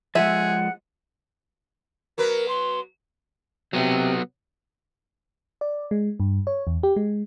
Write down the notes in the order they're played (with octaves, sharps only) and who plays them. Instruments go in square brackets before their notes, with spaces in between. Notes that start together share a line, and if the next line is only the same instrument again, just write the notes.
[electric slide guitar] F3 G#3 [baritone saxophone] G#4 [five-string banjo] E5 [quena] F#5
[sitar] F#3 B3 B4 [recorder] A#4
[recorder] C6
[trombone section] C3 [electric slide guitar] F#3 B3
[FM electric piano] D5
G#3
G2
C#5
E2
G4
G#3